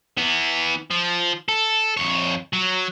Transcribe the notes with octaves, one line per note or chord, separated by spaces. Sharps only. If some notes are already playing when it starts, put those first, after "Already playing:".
E3 B3
F3
A4
F2 C#5
F#3